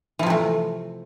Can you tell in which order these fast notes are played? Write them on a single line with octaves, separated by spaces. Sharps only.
E3 F3 C3 A3